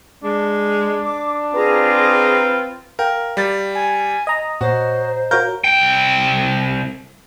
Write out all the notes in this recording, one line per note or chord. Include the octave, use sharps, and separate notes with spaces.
G#3 D4
D6
C4 F4 G#4 B4 A#5
A#4 F5 G5
G3 A6
G#5
D#5 A#5
A#2 F#4 C5 C#5
F#4 A#4 C#5 F5 G6
C2 G5